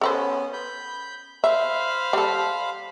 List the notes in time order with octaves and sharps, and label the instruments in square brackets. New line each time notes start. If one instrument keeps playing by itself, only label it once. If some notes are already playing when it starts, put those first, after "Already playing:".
[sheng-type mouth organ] B3 C#4 [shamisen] A4 B4 C5
[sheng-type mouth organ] B5 G6
[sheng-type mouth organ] C5 F5 B5 [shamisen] E5
[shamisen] G3 A4